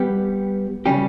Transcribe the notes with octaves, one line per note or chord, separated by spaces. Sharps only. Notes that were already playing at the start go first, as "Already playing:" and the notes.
Already playing: G3 B3 G4
C#3 G3 C#4 G4